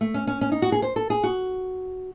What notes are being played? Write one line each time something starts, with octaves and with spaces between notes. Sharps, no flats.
A3
C#4
C#4
C#4
D#4
F#4
G#4
C5
A4
G#4
F#4